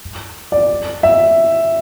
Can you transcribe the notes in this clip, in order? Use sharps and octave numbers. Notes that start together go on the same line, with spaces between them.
D5
E5